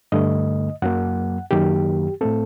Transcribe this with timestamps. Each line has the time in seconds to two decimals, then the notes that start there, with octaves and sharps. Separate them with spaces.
0.12 G2 D3 A3 D#5
0.82 F#2 F#3 A#3 F#5
1.51 F#2 D#3 F#3 A#3 G4
2.21 A2 A3 C4 A4